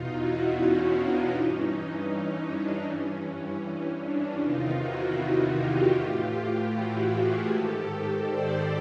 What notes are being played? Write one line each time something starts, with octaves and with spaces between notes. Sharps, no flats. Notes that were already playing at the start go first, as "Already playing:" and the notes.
Already playing: E2 B2 D#4 F4
E4 F#4
C#4
D4
G2 E3 C#4 D#4
D4
G2 E3 C#4
D4
E2 C3 D#3 D#4 F4
E4 F#4
F4 G4
A2 E3
E4 F#4
F#4 G#4
G#2 D#3 G4 A4
C5 D5